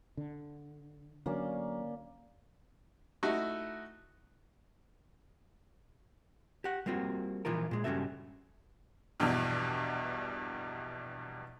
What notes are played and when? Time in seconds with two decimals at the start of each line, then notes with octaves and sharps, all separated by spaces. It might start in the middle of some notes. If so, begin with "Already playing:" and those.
0.17 D3
1.26 D3 F#3 A#3 C#4 D5
3.23 A3 D#4 E4 F#4
6.64 G4 F#5
6.86 G3 A#3 C4 F4 F#4
7.45 A#2 E3 F3 F4 A#4
7.71 A#2 G#3
7.84 G2 C#3 C#4 F#4 A4 E5
9.20 A#1 E2 G2 B2